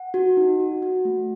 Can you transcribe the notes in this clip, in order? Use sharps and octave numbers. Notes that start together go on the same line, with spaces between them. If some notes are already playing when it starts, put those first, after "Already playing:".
Already playing: F#5
F#4
D#4
F#4
F#4
A3